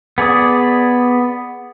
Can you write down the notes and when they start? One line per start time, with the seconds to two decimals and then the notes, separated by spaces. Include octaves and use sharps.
0.18 B3 G#4 D5 D#6